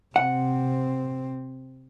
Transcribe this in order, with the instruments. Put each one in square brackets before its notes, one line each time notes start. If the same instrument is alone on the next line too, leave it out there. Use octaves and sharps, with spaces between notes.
[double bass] C3 C4 [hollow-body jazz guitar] F#5